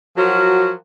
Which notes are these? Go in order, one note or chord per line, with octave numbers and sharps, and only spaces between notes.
F3 F#3 F#4 A#4